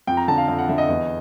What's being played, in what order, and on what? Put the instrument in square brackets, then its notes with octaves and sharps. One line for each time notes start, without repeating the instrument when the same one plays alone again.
[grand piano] F2 G5
A#5
D3 A5
F5
F2 F5
F#5
D3 E5
D#5
E2